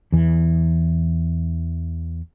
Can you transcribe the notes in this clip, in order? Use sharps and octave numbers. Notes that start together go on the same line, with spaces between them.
E2 E3